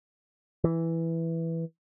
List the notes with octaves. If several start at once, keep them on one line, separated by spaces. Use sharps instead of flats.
E3